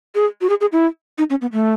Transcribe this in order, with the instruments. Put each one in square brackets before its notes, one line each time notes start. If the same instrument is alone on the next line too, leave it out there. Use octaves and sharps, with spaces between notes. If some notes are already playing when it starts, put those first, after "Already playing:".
[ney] G#4
F#4
G#4
G#4
E4
D#4
C#4
B3
A3